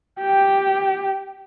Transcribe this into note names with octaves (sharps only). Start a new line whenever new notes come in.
G4 G5